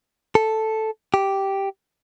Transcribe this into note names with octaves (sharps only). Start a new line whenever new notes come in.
A4
G4